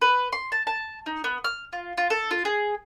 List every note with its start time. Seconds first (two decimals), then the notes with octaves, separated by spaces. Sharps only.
0.01 B4
0.32 C6
0.52 A5
0.67 A5
1.06 D#4
1.24 B3
1.44 F6
1.73 F4
1.97 F4
2.10 A4
2.31 F4
2.45 G#4